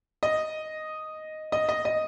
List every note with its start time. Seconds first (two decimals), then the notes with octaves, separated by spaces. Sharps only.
0.23 D#5
1.52 D#5
1.69 D#5
1.85 D#5